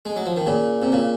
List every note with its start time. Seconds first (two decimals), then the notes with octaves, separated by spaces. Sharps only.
0.05 G#3
0.16 F#3
0.26 F3
0.36 D#3
0.46 A#2 C#3
0.82 C3
0.92 A#2 C#3